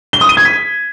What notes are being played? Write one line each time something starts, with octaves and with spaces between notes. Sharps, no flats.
G7
D#6
D#7
G#6
B6